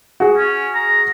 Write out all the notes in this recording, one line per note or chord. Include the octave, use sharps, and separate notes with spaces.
F#4 G#4
C#4
A#5